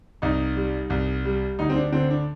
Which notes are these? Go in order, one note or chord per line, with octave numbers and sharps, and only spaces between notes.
C2 D#4
G3
C2
G3
D2 D#4
C4
D4
D3 C4
D4